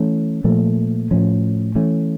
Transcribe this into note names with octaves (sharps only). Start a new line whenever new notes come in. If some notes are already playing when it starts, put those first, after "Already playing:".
Already playing: E3 A3 C#4
A#2 F3 A3
A2 F3 C#4
E3 A3 C#4